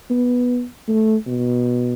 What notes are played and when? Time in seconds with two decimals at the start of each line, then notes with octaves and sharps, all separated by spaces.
0.10 B3
0.88 A3
1.27 B2